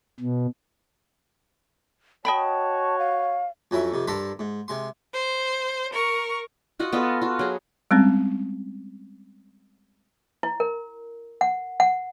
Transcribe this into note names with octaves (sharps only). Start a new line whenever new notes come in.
B2
F#4 C#5 D#5 G5 A5 B5
F5
F2 F#3 C#4 E4
F2 C3
G2 A4 A#4 C5 B5
G#2
C3 G#3 C6
C5
A#4 C#6
F4 F#4 D#5 F#5
B3 F4 A4 D#5
F4 F#4
F#3 G#4
G3 G#3 C4 C#4
E4
A#4
F#5
F#5